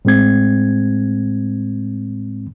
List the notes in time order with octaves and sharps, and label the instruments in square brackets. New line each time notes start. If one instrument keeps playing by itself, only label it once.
[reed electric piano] A2 G#3 C4 G#6